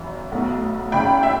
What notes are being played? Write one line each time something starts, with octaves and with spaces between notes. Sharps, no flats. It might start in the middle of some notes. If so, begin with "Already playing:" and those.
Already playing: G1 F#2 E3
B1 A2 F#3 B3
F#1 F#2 C#3 G5 B5
E5 G5